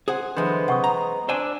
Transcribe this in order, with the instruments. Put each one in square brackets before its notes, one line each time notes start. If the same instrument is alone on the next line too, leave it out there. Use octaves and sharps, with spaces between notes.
[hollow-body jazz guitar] G#4 C5 F#5
[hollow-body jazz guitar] D3 E3 F#3 [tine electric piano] G#3 B3 C5
[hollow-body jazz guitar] C3 [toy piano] F#5 C#6 D#6
[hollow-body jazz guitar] A#5
[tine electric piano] D4 E6 [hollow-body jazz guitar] C5 D5 G#5